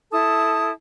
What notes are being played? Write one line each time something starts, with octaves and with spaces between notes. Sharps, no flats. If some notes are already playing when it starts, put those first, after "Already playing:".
E4 A4 A5 D#6